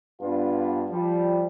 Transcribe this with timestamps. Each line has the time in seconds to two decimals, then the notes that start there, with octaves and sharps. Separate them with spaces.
0.21 G2 B3 D4 F4
0.90 F3 G3